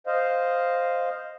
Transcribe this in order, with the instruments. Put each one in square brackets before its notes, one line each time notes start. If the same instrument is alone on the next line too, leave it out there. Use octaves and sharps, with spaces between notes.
[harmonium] C5 D#5 F5